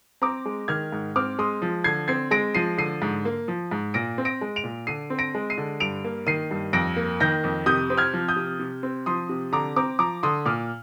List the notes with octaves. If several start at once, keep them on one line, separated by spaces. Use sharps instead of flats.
C4 A#5 D6
G#3
D#3 F6 G#6
G#2
C4 D6 F6
G#3 C6 D#6
F3
D3 G#6 C7
C4 G#6 C7
G#3 A#6 D7
F3 C7 D#7
D3 C7 D#7
G#2
A#3
F3
G#2
A#2 A#6 D7
C4
A#6 D7
G#3
D7 F7
A#2
D3 C7 D#7
C4
A#6 D7
G#3
C7 D#7
D3
G2 D7 F7
A#3
D#3 C7 D#7
G2
F2 A#6 D7
A#3
D#3 G6 A#6
F2
C3 D#6 G6
C4
F6 G#6
F3
D#6 G6
C3
C3
C4
F3 C6 D#6
C3
D3 A#5 D6
C4 A#5 D6
F3 A#5 D6
D3 C6 D#6
A#2 D6 F6